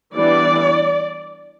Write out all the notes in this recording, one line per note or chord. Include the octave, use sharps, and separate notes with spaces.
E3 G3 B3 D4 D5